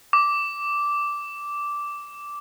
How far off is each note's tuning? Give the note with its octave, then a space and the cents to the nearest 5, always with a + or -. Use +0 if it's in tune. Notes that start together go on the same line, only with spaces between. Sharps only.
D6 -10